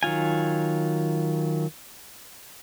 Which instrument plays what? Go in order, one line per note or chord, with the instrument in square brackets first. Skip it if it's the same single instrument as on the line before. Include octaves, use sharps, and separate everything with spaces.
[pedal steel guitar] D#3 F#3 F4 G#5